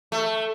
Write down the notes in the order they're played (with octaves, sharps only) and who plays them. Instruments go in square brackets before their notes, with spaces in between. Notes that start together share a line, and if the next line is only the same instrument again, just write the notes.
[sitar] A3